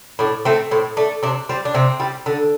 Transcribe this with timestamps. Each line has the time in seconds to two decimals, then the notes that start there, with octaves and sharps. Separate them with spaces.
0.19 A2 D4
0.45 A3 C4
0.71 A2 C4
0.97 A3 D4
1.23 C3 D4
1.49 G3 C4
1.65 D4
1.75 C3 C4
2.00 G3
2.26 D3